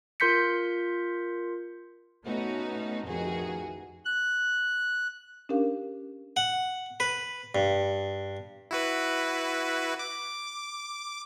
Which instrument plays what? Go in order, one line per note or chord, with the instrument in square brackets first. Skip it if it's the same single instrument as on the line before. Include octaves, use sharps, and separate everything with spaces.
[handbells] F4 A#4 C6 G6 B6 C#7
[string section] A3 B3 C#4 D#4 F#4
A1 F2 D#3 F#4 G#4
[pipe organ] F#6
[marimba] C#4 D4 G4 A#4 F5
[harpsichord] F#5
B4
G2
[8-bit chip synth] E4 F#4 B4
D6